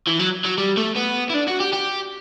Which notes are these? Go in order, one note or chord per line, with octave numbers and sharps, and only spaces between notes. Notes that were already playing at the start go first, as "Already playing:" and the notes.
E3
F#3
F#3
G3
A3
B3
E4
D4
F#4
G4
G4